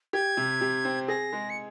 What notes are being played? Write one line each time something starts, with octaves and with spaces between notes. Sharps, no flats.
G4 G#6
C3
C3
C4
G#4 A#6
G#3
C#7